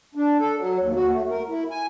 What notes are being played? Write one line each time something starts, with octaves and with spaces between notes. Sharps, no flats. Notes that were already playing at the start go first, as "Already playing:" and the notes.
D4
A4
F#3
D#2
F#4
A3
A#4
E4
G#5